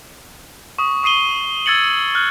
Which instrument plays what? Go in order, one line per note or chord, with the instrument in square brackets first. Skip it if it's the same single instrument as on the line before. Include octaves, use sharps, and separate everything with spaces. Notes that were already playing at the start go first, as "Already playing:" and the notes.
[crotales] C#6 D#6
C#6 D#6 C7 D#7 G7
E6 G#6 A6 C#7 F#7
F6 F#6